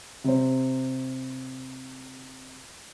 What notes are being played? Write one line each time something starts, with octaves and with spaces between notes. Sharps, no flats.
C3 C5